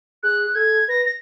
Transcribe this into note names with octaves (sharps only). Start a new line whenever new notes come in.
G#4 F#6
A4 G#6
B4 A#6
A#6